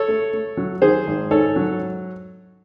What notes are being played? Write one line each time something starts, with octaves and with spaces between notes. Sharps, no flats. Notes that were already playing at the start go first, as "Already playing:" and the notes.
Already playing: A4 C#5
A3
A3
F#3
D#3 G#4 C5
G#1
G#2 A4 C#5
F#3